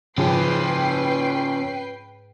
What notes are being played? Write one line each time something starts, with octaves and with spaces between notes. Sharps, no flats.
G#2 C#3 F3 C#4 G4 B4 G5 C7